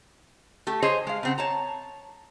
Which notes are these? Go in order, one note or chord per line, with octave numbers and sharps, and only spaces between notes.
A3 G4
G#4 C5 C#5 D#5
G#3 F5
C#3 C4 F#5
C#5 A5 A#5